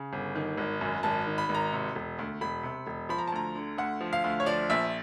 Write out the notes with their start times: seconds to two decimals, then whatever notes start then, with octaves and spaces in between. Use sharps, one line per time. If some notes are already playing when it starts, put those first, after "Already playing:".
Already playing: C#3
0.13 G1
0.35 D#3
0.58 G#1
0.81 F#2
1.03 G#1 A5
1.27 D#3
1.38 B5
1.49 G#1
1.55 A#5
1.72 C3
1.95 E1
2.19 D2
2.41 E1 B5
2.63 C3
2.87 E1
3.09 F3 B5
3.18 A#5
3.28 A5
3.32 D2 A#5
3.55 D3
3.78 D2 F#5
4.01 F3
4.13 F5
4.24 D2
4.40 C#5
4.46 F3 D5
4.70 A#1 E5